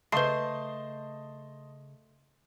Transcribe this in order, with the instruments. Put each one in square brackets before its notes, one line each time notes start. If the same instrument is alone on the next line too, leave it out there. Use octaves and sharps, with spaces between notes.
[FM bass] C#3 [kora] A3 C5 [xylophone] B4 C7 [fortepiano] D#5 A5 C6